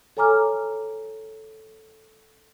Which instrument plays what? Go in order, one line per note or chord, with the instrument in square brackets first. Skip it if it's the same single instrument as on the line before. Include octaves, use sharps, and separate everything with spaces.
[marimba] A4 C#5 G#5 A#5 D6 F6